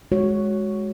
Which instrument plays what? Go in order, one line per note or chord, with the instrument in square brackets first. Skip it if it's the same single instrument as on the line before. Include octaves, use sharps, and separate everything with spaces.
[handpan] G#3 F#4 C#5